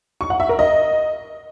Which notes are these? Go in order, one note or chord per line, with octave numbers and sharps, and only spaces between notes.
C#6
F#5
E5
A#4
D#5